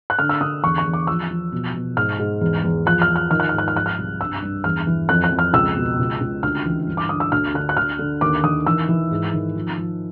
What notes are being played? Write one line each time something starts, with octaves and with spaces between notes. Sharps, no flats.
F#6
D3 F6
E6
D3 D#6
E2 C#6
C#6
E2
D6
F3 E6
F3
B2
B2
G#2 F6
G#2
E2
E2
F3 F#6
F6
F3
F6
D#3 F6
F#6
G#2 F6
F#6
F6
F3 F#6
F6
C2
G2 E6
G2
E2 F6
E3
F2 F#6
F#6
F2
F6
C#2 E6
B2
C#2
C#2
D2 F6
E3
G2
D6
D3 D#6
E6
D2 F6
D3 F#6
F#6
D3 F6
D3
D#2 D6
D#3 D#6
E3 E6
E3
G#2
D#3
F3
F3